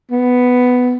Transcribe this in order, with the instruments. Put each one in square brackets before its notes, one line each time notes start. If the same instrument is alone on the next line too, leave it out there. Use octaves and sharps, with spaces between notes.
[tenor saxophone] B3